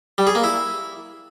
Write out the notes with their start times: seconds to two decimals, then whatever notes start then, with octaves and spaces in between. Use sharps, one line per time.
0.18 G3
0.27 G#4
0.35 A#3
0.44 E4